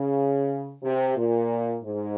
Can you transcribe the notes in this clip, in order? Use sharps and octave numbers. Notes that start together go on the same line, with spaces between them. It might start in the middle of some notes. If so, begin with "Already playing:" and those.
Already playing: C#3
C3
A#2
G#2